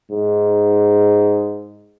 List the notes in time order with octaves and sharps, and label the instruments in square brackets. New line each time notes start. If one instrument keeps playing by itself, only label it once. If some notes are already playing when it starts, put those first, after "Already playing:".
[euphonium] G#2